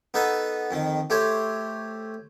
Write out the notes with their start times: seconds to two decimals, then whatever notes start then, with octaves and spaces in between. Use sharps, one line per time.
0.14 B3 D#4 A4 B4
0.71 F2 D#3
1.10 A3 G4 C5 C#5